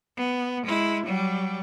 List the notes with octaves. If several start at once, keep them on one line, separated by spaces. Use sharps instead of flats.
B3
G#3 E4
F#3 G3